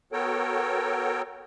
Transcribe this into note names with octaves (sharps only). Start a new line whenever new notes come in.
B3 F#4 A4 A#4 C#5 G5